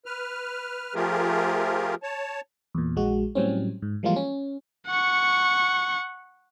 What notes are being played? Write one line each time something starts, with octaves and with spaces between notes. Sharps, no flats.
B4 F6
F3 A3 F4 G4 G#4 A#4
C#5 A5
E2 A#2
A#1 G#3 F#4
A2 F#3 G3 C4 C#4
G#2
E3 F3 G3 G#3 A#3 F4
C#4
F#5 C#6